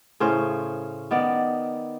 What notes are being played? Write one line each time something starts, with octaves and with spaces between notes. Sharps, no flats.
A2 C#3 C#4 C5
D#3 B3 D5